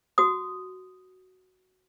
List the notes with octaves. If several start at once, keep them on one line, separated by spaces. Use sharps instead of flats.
F#4 D#6